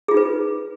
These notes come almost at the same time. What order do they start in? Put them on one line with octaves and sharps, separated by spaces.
G#4 F4 D#4 B4